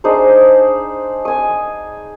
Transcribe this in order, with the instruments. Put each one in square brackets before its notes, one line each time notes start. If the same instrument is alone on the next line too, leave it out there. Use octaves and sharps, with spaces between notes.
[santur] D4 D#4 G#4 C5
G#5 D#6